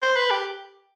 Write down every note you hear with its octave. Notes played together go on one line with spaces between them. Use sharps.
C5
B4
G4